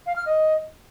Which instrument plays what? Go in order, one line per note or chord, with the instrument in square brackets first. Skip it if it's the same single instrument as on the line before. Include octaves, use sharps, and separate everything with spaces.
[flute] F5
F6
D#5